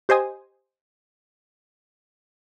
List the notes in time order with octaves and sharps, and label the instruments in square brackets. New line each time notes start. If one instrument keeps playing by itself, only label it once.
[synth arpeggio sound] G4 C5 D#5 G#5 D#6